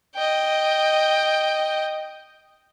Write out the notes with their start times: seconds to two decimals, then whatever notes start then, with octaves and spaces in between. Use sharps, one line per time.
0.15 D#5 G5